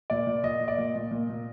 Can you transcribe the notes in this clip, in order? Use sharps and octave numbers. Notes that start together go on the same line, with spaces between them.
A#2 D5
A#2
A#2 D#5
A#2
D5
A#2 D#5
A#2
A#2
A#2